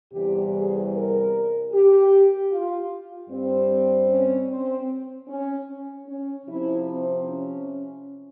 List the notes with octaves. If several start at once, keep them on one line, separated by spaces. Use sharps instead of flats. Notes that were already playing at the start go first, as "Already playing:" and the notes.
E2 C3 E3 G3 G4
G#4
A#4
G4
F4
G2 G3 C4
C#4
C4
C#4
C#4
C3 F3 C4 E4
C4
C#4